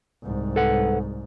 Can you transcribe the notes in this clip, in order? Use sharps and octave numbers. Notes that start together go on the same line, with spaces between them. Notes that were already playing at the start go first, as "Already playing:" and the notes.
C2 G#2
A4 B4 F#5